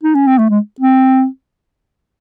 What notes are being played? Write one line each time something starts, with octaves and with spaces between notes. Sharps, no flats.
D#4
C#4
C4
A3
G#3
C4